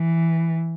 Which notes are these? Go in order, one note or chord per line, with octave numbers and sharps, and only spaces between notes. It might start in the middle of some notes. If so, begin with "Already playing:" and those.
Already playing: E3